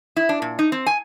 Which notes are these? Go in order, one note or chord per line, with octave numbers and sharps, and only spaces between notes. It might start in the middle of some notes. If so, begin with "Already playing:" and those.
E4
D4
A#2
D#4
C4
G#5